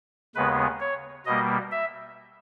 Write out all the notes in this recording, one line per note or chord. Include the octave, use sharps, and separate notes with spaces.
D#2 C#3 G#3 B3 B4
C#5
B2 G3 A#3 D#5
E5